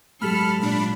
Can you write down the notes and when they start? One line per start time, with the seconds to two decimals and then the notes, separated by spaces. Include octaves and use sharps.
0.21 G#2 F#3 G4 A4 B5 F6
0.61 A#2 D4 B5